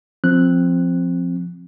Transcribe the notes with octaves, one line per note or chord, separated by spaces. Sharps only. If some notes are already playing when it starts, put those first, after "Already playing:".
F3 C4 F#6